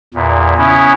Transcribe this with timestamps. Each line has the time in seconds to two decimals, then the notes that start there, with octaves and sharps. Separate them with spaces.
0.14 E2 A#2
0.58 C#3 B3 C#4 E4